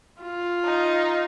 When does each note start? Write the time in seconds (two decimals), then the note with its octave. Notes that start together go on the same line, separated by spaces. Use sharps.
0.22 F4
0.64 D#4